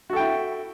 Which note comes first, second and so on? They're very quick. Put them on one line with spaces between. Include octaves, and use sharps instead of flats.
F#4 A4 G5 E4